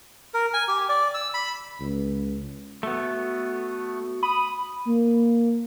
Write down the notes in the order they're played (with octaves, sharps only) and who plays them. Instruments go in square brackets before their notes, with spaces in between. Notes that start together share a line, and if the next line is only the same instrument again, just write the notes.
[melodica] A#4
G#5
G4
D5
E6
B5
[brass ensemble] C#2
[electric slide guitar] A3 B3 [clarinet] F#4
[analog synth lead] B5 [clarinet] D#6
[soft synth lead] A#3